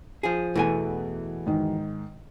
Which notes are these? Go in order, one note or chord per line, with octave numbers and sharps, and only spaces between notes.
F3 G#4
E2 B2 E3 A3 G#5
G#2 D#3